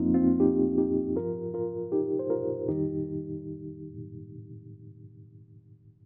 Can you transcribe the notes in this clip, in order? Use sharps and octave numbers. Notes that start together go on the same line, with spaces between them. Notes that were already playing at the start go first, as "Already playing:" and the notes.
Already playing: F2 F3 A#3 C4 D#4 F4
C4 F4
D#4 G4
D#4 G4
G2 F3 F4 A#4
F4 A#4
D#4 G4
C5
F4 A#4
F2 D#3 G3 D#4 G4